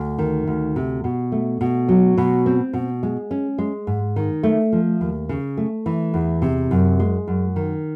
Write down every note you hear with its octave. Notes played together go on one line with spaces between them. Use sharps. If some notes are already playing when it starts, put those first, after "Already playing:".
Already playing: D2
D#3
D2
C3
B2
A3
B2
F#3
B2
C4
B2
G#3
C#4
G#3
G#2
D#3
A3
F3
D#2
C#3
A3
E3
E2
C3
F#2
G#3
F#2
D#3